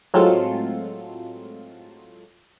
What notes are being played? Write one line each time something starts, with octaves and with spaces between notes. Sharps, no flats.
A2 F#3 G#3 C4 F4 A4